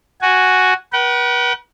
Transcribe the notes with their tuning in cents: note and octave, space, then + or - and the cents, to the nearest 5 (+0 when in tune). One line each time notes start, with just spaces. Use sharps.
F#4 +0 G#5 +0
B4 -40 F#5 +45